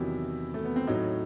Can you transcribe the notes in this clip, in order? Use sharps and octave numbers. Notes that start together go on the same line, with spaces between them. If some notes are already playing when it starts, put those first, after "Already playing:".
Already playing: E2 C3 D#3 F#3 E4
A3
B3
C4
A2 F#3 D#4